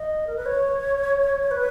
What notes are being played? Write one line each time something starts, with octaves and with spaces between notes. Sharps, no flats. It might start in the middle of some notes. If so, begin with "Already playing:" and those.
Already playing: D#5
A#4
B4
C#5
B4